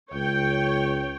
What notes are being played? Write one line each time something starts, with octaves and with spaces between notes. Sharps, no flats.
C#2 C#5 G5